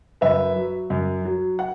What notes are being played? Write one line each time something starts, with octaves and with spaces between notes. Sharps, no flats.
F#2 B4 E5
F#3
F#2
F#3
F#5